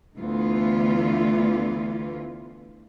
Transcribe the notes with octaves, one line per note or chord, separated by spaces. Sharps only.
D2 E3 B3 F4